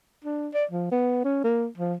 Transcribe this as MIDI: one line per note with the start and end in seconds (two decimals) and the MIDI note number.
0.24 0.49 62
0.54 0.65 74
0.71 0.87 53
0.91 1.20 59
1.24 1.39 61
1.44 1.67 58
1.78 1.95 53